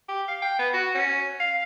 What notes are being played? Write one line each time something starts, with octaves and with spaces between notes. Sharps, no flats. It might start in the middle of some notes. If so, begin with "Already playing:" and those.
G4
F5
G5
B3
F#4
C#4
F5